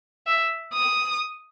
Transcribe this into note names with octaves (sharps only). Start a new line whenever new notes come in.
E5
D#6